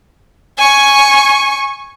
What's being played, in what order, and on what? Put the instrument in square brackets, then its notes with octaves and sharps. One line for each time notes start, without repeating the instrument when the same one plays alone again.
[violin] G#5 C#6